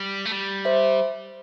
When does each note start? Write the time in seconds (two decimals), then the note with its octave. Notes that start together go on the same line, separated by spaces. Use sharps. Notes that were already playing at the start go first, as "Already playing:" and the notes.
Already playing: G3
0.25 A3
0.31 G3
0.65 C5 E5